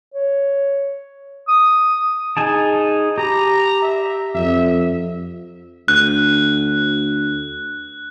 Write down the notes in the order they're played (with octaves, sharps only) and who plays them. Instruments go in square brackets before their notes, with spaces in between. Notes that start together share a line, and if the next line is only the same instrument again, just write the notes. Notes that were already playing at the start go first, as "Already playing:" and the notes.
[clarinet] C#5
D#6
[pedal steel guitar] D#4 G#4 A5
[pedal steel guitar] G4 [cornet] A#5
[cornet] E5
[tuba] F2 [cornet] E5
[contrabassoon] D2 [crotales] F#6